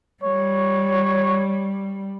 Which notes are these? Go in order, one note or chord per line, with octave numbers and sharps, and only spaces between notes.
G3 C#5